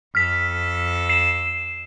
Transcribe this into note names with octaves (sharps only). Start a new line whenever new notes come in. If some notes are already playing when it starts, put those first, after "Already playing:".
F2 A4 F6 B6
C7 E7